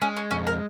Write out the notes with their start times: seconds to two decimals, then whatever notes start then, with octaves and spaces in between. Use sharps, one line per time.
0.02 G#3 C#4
0.16 C#4
0.31 F2 C#4
0.47 A#4